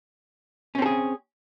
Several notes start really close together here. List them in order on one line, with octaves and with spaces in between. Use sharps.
C#4 C4 A4 G#4